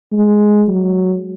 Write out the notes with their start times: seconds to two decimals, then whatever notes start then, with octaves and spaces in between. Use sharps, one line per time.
0.13 G#3
0.68 F#3